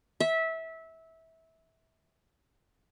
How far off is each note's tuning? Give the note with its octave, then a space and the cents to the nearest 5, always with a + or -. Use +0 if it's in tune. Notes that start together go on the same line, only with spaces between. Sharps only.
E5 -20